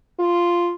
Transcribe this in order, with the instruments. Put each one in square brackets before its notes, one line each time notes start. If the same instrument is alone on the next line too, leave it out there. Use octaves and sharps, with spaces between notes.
[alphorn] F4